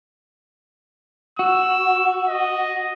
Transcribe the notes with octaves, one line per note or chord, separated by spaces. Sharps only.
F#4 E6
D#5